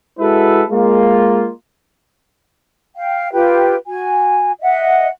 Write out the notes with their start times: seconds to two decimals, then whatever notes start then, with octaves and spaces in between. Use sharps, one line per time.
0.18 G#3 E4 F#4 A4 B4 E5
0.70 G#3 A#3 F4
2.96 F5 G5
3.32 F4 G4 B4 G5
3.88 F#4 G#5
4.60 D#5 E5 F#5